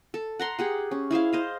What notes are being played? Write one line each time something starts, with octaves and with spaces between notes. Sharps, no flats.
A4
F#5 A#5 C6
G4 G#4 F#5
C#4
E4 G#4 C5 F5
C5 D#5 F5